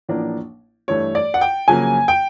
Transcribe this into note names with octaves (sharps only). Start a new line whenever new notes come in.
A1 A2 F3 A#3 D4
G2 E3 A3 C#5
D5
F#5
G5
F2 C#3 F#3 A#3 G#5
G5